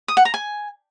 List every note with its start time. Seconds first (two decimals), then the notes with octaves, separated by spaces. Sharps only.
0.08 D#6
0.17 F#5
0.25 A#5
0.34 G#5